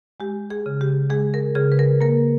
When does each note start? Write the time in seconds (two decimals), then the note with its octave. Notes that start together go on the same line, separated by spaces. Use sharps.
0.20 G#3 G4
0.50 G#4
0.66 C#3
0.81 G4
1.10 G#3 G#4
1.34 A#4
1.55 C#3 G#4
1.72 B4
1.79 A#4
2.01 A#3 A#4